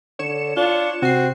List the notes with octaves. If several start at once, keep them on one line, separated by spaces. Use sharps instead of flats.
D3 C#5 C#7 E7
D4 F4
C3 C4 F#4 C7